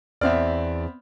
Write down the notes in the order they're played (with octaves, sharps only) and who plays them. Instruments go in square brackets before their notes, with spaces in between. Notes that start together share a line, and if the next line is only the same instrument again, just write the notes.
[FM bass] E2 [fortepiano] B3 C4 F6 [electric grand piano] D5 E5